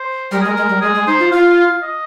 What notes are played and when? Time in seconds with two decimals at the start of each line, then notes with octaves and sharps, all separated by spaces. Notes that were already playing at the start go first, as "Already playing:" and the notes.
Already playing: C5
0.31 G3 A#4
0.41 G#3 G#4
0.50 A#4
0.57 G#3
0.69 G3
0.81 G#3 G#4
0.94 G#3
1.07 D#4 C5
1.19 F4
1.31 F4 F5
1.83 D#5